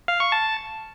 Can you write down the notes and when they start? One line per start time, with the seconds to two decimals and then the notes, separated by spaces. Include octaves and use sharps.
0.08 F5
0.20 C#6
0.32 A5